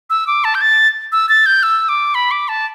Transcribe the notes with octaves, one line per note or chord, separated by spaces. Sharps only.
E6
D6
A5
G6
A6
E6
A6
G6
E6
D6
B5
D6
A5